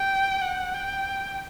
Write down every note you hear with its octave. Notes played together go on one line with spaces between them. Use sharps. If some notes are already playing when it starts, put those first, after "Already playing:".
Already playing: G5
F#5
G5